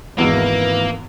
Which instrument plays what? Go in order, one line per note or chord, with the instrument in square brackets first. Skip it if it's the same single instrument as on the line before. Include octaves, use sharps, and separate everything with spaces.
[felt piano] G#1 E3 E6 [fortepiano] E2 B2 G#3 [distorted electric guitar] A#3 [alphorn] B4